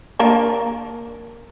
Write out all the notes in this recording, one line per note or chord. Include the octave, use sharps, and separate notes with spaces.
A#3 D4 A#4